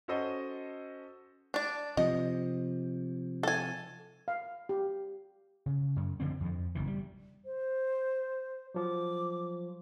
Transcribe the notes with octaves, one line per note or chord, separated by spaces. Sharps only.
C#4 F#4 A4 C5 D#5
D4 D5
C3 F3 D#5
A4 G#5
F5
G4
C#3
F#2
D3 F3 C4
F2 F3
F#1 B2 E3
G3
C5
F3 F#3 D6